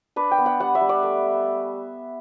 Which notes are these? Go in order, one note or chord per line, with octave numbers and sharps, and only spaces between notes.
D4 B4
G5
B3
F#5
G3 F#5
E5
G3
D5
A3